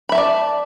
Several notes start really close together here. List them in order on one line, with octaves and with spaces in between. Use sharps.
B5 E5 A5 D5